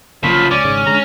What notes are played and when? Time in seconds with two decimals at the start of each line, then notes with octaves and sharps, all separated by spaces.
0.23 G1 C#3 F3 F#3 A#3 B5
0.51 C#2 C#4 D5
0.64 G#1 G#2 C#3
0.86 D3 G#3 A#5